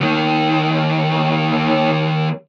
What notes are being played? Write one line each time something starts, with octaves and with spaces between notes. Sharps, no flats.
D#2 D#3